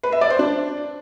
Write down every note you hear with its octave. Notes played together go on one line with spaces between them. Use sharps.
B4
E5
D5
C5
D4